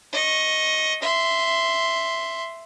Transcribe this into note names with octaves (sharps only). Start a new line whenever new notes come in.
D#5 C#6
E5 C6